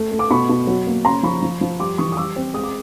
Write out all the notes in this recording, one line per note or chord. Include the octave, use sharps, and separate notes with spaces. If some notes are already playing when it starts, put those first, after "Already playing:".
Already playing: A3
A3
D6
B2 B5 C#6
B2
F#3
A#3
C#3 A#5 C6
F3 B5 C#6
F3
F3
G3 C6 D6
E3 C#6 D#6
D#6
G3 D6 E6
C4
G#3 D#6
D6